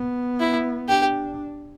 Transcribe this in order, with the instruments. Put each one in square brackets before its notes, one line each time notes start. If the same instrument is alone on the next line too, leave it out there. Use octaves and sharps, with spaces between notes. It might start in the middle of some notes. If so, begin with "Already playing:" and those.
Already playing: [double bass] B3
[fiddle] E4
[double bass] D4 [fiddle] G4